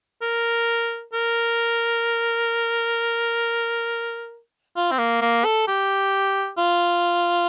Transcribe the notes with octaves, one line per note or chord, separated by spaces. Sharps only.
A#4
A#4
F4
C4
A#3
A#3
A4
G4
F4